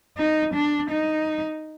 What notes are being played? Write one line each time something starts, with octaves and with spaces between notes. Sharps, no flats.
D#4
D4
D#4